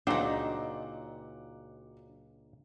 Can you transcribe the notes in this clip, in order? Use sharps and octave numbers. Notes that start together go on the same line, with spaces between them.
C#2 A#2 F#3 D4 D#4 C5 F#5 D6